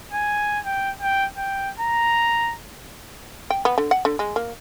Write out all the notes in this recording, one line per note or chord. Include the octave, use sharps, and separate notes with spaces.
G#5
G5
G5
G5
A#5
G5
B3
D3
F#5
D3
G#3
A#3